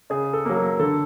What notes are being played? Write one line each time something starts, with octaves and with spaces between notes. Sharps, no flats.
C#3 G#4
A4
F#3 A#3
A#4
D3 A4